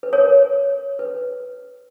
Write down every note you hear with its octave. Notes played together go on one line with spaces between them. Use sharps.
B4
A#4 C#5
B4